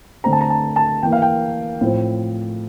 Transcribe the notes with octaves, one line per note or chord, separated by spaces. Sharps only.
D3 A3 C4 A#5
A5
A#5
A5
A5
E3 A#3 G5
F5
G5
A2 F3 C4